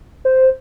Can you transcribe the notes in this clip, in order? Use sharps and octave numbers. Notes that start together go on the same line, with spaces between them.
C5